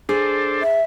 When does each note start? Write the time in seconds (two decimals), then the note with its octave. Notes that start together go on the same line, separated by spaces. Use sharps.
0.09 D4 G#4 A4 C5
0.62 E5